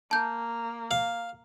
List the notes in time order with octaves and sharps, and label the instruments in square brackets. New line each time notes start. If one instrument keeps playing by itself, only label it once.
[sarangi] A#3 [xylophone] A5 G6
[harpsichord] F5